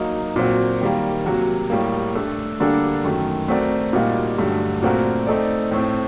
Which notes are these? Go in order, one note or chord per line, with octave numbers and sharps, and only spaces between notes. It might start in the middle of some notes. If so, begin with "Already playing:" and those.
Already playing: F#3 A#3 D#4
A#2 F#3 C4 F#4
D#3 G3 A#3
C3 F#3 A#3 F#4
A2 G3 A#3
A3 D4 A4
D3 G3 A#3 D4 A4
F#2 D#3 A3
A3 C4 F#4 A#4 D5
A#2 G3 A#3 D#4 F#4
G2 D3 F#3 A3
A#2 A3 C4 F#4 A#4
A3 C4 D#4 A4 D5
A2 A3 C4